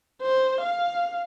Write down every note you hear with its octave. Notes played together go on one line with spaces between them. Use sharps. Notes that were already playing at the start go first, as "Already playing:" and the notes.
C5
F5